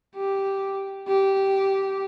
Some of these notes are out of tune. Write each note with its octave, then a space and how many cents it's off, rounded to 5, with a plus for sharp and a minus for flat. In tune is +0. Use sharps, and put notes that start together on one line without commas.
G4 -5
G4 -10